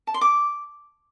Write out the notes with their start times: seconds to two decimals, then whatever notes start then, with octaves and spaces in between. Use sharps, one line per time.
0.07 A5
0.14 C6
0.21 D6